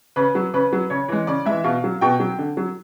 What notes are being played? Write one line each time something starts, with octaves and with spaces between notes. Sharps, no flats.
C#3 B4
F#3
C#3 B4
F#3
C#3 C#5
E3 G#3
C#3 D5
E3 G#3 E5
B2 F5
F#3
B2 G5
F#3
D3
F#3